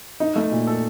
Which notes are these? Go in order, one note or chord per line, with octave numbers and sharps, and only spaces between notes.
D#4
A3
A#2
A4